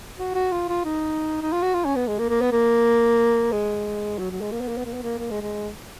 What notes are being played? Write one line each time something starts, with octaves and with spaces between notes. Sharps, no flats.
F#4
F#4
F4
F4
D#4
D#4
F4
F#4
F4
C#4
B3
G#3
A#3
A#3
B3
A#3
G#3
F#3
F#3
G#3
A#3
B3
A#3
B3
A#3
B3
A#3
A#3
G#3
G#3